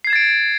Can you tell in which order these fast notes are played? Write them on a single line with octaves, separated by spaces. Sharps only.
C7 G#6 E7 A6 D7